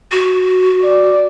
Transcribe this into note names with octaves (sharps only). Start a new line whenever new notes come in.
F#4
D5